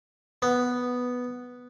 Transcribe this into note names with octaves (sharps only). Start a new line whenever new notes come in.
B3